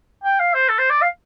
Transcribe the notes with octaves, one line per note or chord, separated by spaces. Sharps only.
G5
F5
C5
A4
C5
D5
F5